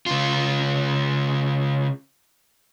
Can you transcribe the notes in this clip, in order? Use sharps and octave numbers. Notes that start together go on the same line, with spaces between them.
C#3 F4